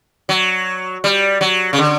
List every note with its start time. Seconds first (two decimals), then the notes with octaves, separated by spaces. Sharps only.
0.29 F#3
1.04 G3
1.41 F#3
1.73 C#3
1.78 D3